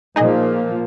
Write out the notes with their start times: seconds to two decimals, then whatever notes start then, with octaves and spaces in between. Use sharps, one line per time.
0.16 A#2 F3 A#3 D#4 G#4 D#5